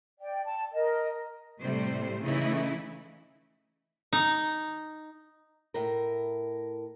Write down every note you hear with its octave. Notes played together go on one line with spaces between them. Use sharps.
D5 G5
A5
A#4 D#5
A2 C3 G3 A3 C5
C#3 E3 A3 D#4 E4
D#4
A2 A#4